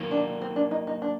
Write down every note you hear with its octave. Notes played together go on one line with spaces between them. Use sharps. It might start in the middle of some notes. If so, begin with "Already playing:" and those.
Already playing: D#2 D#3 F#3 A#3
D4
C4
D4
D#4
D#4
D4